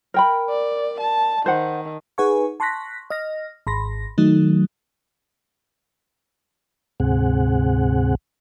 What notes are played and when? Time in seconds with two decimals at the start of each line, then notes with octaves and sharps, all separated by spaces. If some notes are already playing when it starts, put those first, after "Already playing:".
0.14 A#4 G5 B5
0.49 D5
1.00 A5
1.46 D#3 C5 F#5
2.18 D#4 G#4 B4 F#5 G#5 C#6
2.60 A5 C6 C#6 F#6 A#6 B6
3.10 D#5 F6 A#6
3.67 G#1 B5 C6 A#6
4.18 D#3 F#3 A3 D#4
7.00 D2 G#2 C3 C4 G#4 F#5